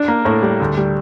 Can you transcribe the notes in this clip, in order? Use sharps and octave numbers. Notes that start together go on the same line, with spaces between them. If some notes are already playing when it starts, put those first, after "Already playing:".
Already playing: D4
A#3
A2
G3
D2
G3